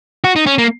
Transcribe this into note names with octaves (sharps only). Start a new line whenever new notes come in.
F#4
D#4
C#4
A#3